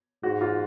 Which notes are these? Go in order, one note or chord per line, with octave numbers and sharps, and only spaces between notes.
G#2 F#4
F4